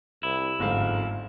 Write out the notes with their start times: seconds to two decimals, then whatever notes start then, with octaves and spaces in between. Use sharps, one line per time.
0.23 C2 E4
0.59 G1 F2 G#2 F5